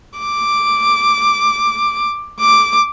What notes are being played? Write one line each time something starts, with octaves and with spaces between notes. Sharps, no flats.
D6
D6